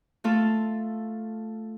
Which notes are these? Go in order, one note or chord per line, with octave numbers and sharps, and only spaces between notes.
A3 F4 A4